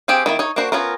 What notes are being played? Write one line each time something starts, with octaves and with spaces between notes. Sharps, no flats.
C4 G4 G#4 F5
D#3 A#3 E4
D#4 C#5
A#3 D4 F#4 C5
B3 C#4 F4 A#4